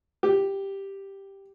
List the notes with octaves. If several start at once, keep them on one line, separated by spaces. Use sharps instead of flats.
G4